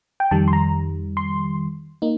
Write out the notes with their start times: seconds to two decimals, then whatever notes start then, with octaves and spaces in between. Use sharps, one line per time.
0.20 G5
0.31 F2 D#3 G3 A5
0.48 C6
0.53 A#5
1.17 C6
2.02 A#3 D#4